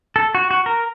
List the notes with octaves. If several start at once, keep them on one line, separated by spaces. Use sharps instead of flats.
A4
F#4
F#4
A#4